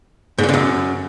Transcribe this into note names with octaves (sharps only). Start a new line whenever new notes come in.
G#2
A#2
D3
F#2